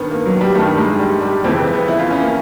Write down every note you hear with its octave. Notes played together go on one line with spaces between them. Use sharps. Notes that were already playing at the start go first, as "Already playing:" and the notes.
Already playing: G2 D#3 B3
A#3
F#3
G3
G2 D#3 A3
G#3
G3
G3
F2 C#3 E3 C4
B3
B3
E4
F4
C#4
A#3